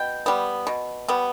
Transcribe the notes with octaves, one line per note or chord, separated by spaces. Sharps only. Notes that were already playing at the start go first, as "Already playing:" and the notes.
Already playing: B2 G5
G3 B3
B2
G3 B3